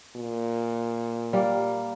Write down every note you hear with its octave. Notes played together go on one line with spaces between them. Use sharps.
A#2
G3 A#3